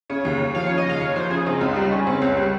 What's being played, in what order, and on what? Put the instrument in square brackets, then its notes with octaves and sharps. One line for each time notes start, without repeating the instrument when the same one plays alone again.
[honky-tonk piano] C#3 [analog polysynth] C#5
[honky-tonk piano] D#2
D#2
[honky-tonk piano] F3 [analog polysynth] F5
[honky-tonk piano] C#3 [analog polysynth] C#5
[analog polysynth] D#5
[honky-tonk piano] D#2 [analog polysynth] F5
[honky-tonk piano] D#2 [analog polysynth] C#5
[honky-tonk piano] F3 [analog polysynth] C5
[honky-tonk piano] C#3 [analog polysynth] G#4
[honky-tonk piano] C4 [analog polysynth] D#4
[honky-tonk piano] C#2 [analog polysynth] F4
[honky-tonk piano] G3 [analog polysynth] D#4
[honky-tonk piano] C#3 [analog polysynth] C#4
[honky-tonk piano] C4
C#2
G3